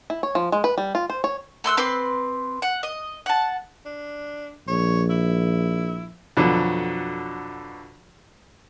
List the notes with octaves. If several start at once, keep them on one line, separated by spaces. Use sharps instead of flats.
E4
C#5
F3
G#3
B4
G3
F4
C5
C#5
A3 C6 E6 F#6
C4 B4 C6 D6
F#5
D#5
F#5 A5
D4
A#1 C#5
E4
F2 B2 D3 F#3